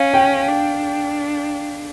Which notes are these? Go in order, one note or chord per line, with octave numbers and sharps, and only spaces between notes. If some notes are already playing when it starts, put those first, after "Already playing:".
Already playing: C#4 F5
G5
D4